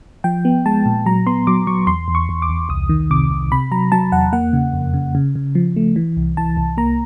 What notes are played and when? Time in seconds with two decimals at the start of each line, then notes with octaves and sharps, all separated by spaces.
0.24 F3 G5
0.45 B3
0.66 G#3 A5
0.86 A#2
1.06 F#3 A#5
1.27 B3 C6
1.47 F#3 D6
1.67 F#3 C#6
1.87 E2 C6
2.08 E2
2.15 C#6
2.29 E2
2.42 D6
2.49 E2
2.69 C2 D#6
2.89 D#3
3.10 C3 D6
3.31 C2
3.52 C3 B5
3.72 F#3 A#5
3.92 F#3 A5
4.12 E2 F#5
4.33 A#3 F#5
4.53 C#3
4.74 F2
4.94 C#3
5.15 C#3
5.36 C#3
5.55 F3
5.76 A3
5.96 E3
6.17 C2
6.37 E3 A5
6.57 C2
6.77 A#3 A#5